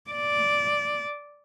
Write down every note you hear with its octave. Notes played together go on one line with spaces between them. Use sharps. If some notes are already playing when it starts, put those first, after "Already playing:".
D5